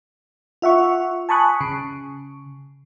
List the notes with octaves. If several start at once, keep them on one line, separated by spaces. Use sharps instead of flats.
F4 E5 F#5 C#6
G#5 A5 B5 C#6 D#6 F#6
C#3